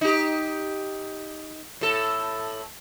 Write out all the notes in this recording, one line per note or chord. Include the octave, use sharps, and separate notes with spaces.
D#4 G4
A2 A4